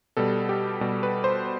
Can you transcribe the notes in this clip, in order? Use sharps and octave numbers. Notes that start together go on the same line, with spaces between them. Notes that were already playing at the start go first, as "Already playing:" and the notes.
B2 G3 A4
G4
B2 G3
B4
C5